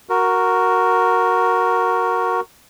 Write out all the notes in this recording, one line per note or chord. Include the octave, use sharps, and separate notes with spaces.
F#4 A#4